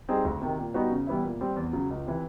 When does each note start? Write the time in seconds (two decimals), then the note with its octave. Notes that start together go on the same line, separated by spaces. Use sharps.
0.09 G3 C4 D#4 G#4
0.25 D2
0.42 C3 D#3
0.58 A#2
0.74 G3 B3 D#4 F#4
0.91 C#3
1.07 E3 G3 B3 E4
1.24 A#2
1.41 G3 C4
1.56 E2
1.73 C#3 F#3
1.90 C#2
2.06 C3 E3